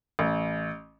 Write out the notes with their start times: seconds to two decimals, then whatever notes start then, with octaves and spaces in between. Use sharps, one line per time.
0.19 A1